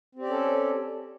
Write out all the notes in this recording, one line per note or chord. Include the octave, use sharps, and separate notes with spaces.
C4 C#4 G4 A4 D5